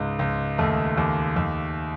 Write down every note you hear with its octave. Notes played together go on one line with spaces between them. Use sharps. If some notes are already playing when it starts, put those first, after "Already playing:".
Already playing: C#2 G#2
C#2
D#2 A3
D#2
D#2